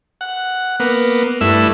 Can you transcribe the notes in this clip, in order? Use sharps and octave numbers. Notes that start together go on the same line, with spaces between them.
F#5
A#3 B3
G2 A3 E4 E6